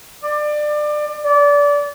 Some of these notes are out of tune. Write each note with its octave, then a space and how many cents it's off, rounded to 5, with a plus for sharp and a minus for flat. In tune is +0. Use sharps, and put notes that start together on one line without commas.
D5 +25
D5 -25